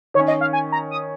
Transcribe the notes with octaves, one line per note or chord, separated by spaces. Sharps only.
D#3 C#5
C#4
D#5
F5
G#5
A#5
D#6